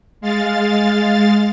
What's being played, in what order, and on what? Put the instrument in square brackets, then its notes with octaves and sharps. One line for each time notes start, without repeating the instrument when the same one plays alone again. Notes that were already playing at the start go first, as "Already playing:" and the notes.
[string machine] G#3 F5 A6